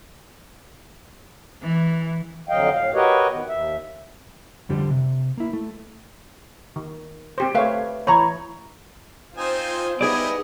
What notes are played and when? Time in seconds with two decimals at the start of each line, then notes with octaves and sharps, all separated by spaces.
1.62 E3
2.49 F2 D3 F#3 D#5 F5 G5
2.73 A2 F5
2.94 F#4 G4 A#4 B4 C#5 D#5
3.31 D#3 B3
3.48 D#2 E5
4.69 F2 D3 G3 C5 C6
4.90 C3
5.37 A#3 E4
5.53 A3
6.76 D#3
7.38 C4 G4 C5
7.55 A3 B4 C#5 E5 F5
8.07 E3 C#5 A#5 B5
9.37 C4 D#4 F4 C5 G#5
10.01 G3 B3 D#4 E4 G#4 D5 D#5 D#6